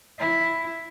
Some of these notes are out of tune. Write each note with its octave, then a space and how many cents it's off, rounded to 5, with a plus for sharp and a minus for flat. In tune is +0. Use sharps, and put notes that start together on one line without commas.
E4 +0